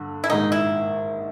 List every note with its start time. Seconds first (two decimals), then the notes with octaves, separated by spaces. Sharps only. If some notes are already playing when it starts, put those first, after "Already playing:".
Already playing: G2 D3
0.24 E4
0.29 A#1 G#2 D#3 G#3 D#4
0.52 E4